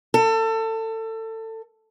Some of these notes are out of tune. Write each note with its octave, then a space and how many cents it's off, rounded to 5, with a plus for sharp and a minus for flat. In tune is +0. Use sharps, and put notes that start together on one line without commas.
A4 +25